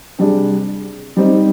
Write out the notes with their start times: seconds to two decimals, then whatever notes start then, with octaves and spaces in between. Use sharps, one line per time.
0.19 C3 G3 D4 G#4
1.17 G3 C4 D#4